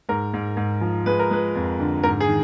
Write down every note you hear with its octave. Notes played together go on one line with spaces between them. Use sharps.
G#2 A#4
G#2
G#2
F3
G#3 B4
A#4
G#3 B4
F2
D3
G#2 A#4
G#4
D#3